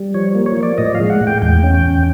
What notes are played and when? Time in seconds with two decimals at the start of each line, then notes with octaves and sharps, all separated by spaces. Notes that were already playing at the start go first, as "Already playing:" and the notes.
Already playing: G3
0.14 F3 C#5
0.35 A#3
0.46 C#5
0.57 F3
0.63 D5
0.78 A2 D#5
0.95 F5
1.00 G#3
1.10 F#5
1.21 A2
1.27 G5
1.42 E2 G5
1.63 C#4
1.75 G5
1.85 E2